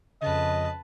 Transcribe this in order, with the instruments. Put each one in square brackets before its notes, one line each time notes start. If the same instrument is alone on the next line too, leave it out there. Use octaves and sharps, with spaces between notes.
[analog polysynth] F2 C#3 [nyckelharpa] B4 A5 [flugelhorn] D#5